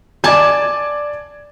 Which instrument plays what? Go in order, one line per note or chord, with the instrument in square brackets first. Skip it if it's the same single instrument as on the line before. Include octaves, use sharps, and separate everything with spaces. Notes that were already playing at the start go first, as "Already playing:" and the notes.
[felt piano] D5 D6 G#6 [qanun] G#5 A5